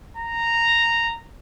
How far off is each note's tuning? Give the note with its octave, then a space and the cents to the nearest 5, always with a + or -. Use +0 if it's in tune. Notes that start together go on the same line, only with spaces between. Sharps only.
A#5 -10